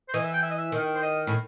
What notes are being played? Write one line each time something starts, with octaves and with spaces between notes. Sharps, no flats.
C5
E3 D#5
E5
G5
E5
D#5
E5
D#3
C5
D#5
A2